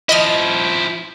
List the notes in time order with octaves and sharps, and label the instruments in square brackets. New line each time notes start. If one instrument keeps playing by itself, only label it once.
[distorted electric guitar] F3 E4 [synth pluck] D#5 B5 F6